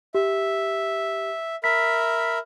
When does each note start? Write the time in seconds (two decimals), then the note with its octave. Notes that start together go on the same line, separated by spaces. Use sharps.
0.15 G4 E5
1.64 A#4 E5 B5 B6